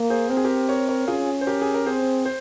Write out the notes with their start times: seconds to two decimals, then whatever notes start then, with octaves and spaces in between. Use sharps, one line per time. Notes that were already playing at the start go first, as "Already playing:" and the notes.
Already playing: A#3
0.10 G#4 C5
0.30 C4 A#4
0.37 G#4
0.44 G4 A#4
0.69 A#4 C#5
0.88 A#4 C#5
1.08 C#4 F4 G#4
1.41 C5
1.47 G4 A#4
1.62 G#4
1.74 A#4
1.86 C4 G#4 C5
2.25 C5